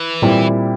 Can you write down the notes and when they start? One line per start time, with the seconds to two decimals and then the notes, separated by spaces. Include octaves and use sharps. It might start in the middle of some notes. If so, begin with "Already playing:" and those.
Already playing: E3
0.22 A#2 G3 C4 E4